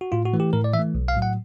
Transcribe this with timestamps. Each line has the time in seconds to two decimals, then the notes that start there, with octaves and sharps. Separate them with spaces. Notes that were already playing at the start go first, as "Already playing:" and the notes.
0.01 F#4
0.12 A2 F4
0.25 F#4
0.34 E3 A3
0.40 G4
0.53 A2 A#4
0.64 D5
0.73 E3 E5
0.79 A3
0.95 B1
1.08 F5
1.15 A2 F#3
1.22 F#5